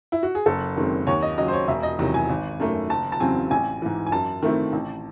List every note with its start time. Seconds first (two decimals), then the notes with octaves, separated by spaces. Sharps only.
0.12 E4
0.23 F#4
0.35 G#4
0.46 F#1 A4
0.76 F#2 D#3 G#3 C4
1.07 D#2 C#5
1.22 D#5
1.38 C#3 F#3 D#5
1.48 C5
1.53 C#5
1.68 E1 E5
1.83 D#5
1.99 E2 C3 D#3 F#3
2.14 G#5
2.29 G#1
2.60 F#2 D#3 A3
2.90 F#1 A5
3.12 A5
3.20 E2 C#3 F#3 C4 G#5
3.51 A1 G#5
3.82 G#2 E3
4.06 G#5
4.12 F#2 A5
4.43 D#3 A3 C4 E4
4.73 A1